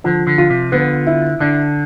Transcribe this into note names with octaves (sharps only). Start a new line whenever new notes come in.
D3 F3
D3
F4
C3
D3 B3
E4
D3 D4